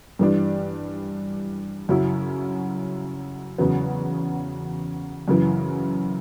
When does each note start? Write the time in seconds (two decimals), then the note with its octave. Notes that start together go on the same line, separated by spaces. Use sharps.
0.19 G2 E3 G3 D4
1.89 F#2 C#3 F#3 C#4 E4
3.58 E2 C#3 F#3 B3
5.28 F#2 C#3 E3